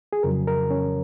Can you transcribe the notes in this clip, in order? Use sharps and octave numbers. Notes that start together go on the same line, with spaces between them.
G#4
F2 C#3 F#3 A#4
A#4
C#4